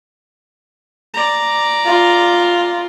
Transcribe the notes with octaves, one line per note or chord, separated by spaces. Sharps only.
D5 A#5
F4